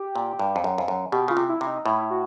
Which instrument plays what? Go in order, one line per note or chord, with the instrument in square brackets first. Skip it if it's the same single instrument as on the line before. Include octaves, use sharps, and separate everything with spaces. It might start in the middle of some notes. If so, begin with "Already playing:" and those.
Already playing: [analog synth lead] G4
[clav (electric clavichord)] A#2
G2
F2
F#2
F2
F#2
[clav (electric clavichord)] B2 [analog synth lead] G4
[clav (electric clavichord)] C#3 [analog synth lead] F4
[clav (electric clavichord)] C3
[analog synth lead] E4
[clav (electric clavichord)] C3 [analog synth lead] E4
[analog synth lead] D#4
[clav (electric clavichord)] A2 [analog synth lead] E4
[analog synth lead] F#4